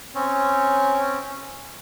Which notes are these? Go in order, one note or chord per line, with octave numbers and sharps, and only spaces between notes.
C4 C#4 C#5